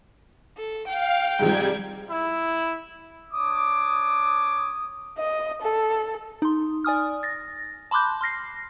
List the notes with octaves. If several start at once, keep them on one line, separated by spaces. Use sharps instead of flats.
A4
F5 G5
G#2 C3 F3 G3 G#6
E4
D4 C#5 D6 D#6
D#5
A4
D#4 C6
D5 G#5 D#6 F6
A6 A#6
A5 B5 C6 D6 F#6 G6
C6 F6 A#6 C7